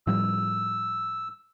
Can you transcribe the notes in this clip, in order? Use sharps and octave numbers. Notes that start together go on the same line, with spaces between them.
A2 F3 G3 E6